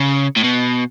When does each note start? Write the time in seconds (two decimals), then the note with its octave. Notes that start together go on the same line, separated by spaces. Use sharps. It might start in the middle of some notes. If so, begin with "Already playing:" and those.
Already playing: C#3
0.37 A2
0.44 B2